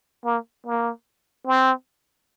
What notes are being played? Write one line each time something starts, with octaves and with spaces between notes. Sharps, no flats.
A#3
A#3
C4